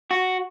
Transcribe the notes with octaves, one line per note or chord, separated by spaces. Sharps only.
F#4